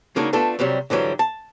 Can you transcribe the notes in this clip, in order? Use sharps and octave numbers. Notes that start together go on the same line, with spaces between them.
C#3 G#3 A#3 D4 D#4 F#4
A3 B3 D4 F4 A4
C2 C3 F#3 G3
G#2 D3 E3 F#3 G3
A5